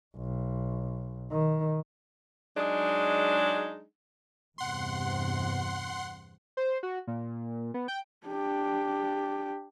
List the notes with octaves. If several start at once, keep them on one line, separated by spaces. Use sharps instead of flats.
B1
D#3
F#3 G#3 D4 D#4 G#4
E2 G2 C3 F#5 C6
C5
F#4
A#2
B3
G5
D4 G4